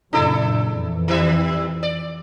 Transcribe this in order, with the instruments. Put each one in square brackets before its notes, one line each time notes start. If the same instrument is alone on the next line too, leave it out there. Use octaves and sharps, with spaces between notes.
[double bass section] F#2 A#2 C#3 [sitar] D4 E4 A4
[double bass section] F2 E3
[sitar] D#3 G3 E5
D5